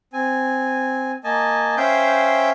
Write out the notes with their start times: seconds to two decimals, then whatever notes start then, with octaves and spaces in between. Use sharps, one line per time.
0.13 C4 G#5
1.24 A#3 D#5 G#5 A5
1.77 C#4 C5 E5 F5 G5 G6